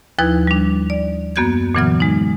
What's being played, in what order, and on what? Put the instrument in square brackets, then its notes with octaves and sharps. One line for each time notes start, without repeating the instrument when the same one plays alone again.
[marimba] D#2 F3 D#4 E4 B4 G#6
G3 D4
D5
F#2 A#3 B3 F#4 G6 G#6
A#2 D3 E3 F#3 B3 F6
G#3 D#4